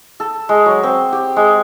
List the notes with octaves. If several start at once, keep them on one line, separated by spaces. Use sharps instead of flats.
A4
G#3
F#3
C4
G4
G#3